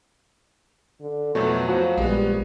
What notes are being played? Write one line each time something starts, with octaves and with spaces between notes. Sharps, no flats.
D3
F2 B2 F#3 A3
F3 F#4
A#1 G3 G#3 B3